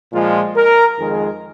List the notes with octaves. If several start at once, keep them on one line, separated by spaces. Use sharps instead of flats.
A#2 F3 G#3 F4
A#4
F2 D#3 G#3 G#4